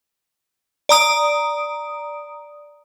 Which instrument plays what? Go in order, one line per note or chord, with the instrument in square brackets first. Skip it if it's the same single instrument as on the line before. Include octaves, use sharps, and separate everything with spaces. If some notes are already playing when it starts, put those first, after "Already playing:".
[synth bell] D5 A#5 D#6 D7